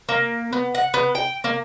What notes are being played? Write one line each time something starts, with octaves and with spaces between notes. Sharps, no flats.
A#3
B3
F#5
B3
G5
A#3